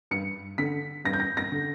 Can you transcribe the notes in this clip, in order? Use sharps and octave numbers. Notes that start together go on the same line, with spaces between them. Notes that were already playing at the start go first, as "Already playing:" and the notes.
G2 C#7
D3 B6
G2 A#6
G6
A#6
A#6
D3